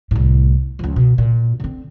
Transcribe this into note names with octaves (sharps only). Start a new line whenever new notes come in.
C2 A2
C#2 F3
B2
A#2
D3 C4